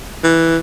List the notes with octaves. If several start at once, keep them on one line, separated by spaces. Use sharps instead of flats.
E3